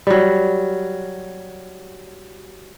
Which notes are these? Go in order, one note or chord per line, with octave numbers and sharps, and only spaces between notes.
F#3 G3